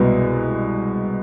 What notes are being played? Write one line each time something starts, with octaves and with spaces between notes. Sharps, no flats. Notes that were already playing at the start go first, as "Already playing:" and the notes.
Already playing: C2 B2 G#3 B3